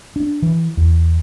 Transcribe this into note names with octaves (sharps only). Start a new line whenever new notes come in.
D4
E3
E2